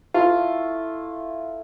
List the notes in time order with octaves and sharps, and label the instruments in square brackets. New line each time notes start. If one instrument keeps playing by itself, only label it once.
[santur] A3 E4 [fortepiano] F4